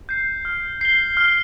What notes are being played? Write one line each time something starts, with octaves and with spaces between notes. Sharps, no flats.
G6 C7
F6
C7 G7
F6